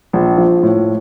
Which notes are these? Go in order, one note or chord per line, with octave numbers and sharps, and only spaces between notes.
A#1
F3
A2